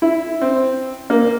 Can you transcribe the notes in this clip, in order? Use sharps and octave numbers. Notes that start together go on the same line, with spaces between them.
E4
C4
A#3